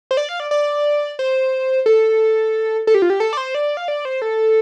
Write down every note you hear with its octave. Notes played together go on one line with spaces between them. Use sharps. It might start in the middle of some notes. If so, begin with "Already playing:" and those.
C5
D5
F5
D5
D5
C5
A4
A4
G4
F4
G4
A4
D5
C5
D5
F5
D5
C5
A4